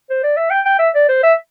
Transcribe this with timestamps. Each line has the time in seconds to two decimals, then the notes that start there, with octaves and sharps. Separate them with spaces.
0.10 C5
0.23 D5
0.36 E5
0.50 G5
0.65 G5
0.79 E5
0.95 D5
1.09 C5
1.23 E5